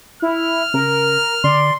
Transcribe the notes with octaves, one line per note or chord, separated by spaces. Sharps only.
E4 F6
C#3 A#4
D3 D5 C6